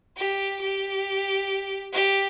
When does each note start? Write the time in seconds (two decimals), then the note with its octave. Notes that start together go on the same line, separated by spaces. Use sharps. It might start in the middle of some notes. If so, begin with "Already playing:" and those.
0.17 G4
0.62 G4
1.93 G4